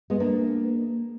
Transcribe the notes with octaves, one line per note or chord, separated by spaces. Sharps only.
G#3 B3
A#3 D4